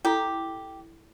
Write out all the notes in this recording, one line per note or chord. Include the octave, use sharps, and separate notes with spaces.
E4 G4 A4 A#5